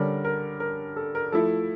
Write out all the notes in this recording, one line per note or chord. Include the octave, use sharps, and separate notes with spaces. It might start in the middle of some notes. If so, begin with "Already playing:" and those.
Already playing: D3 G3 C#4 A#4
A#4
A#4
A4
A#4
F3 A3 E4 A4